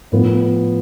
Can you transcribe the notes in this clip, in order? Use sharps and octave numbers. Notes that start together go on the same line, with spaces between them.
A2 F3 B3